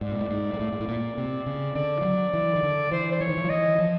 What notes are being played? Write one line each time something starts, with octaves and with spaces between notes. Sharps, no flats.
G#2 D5
A#2
A2
G#2
G#2
A2
G#2
A2
A#2
C3
C#3
D3 D5
F3
F#3
E3
D#3
D3
E3 C5
C5
E3 C#5
D#3
E3
F3
E3 D#5
F3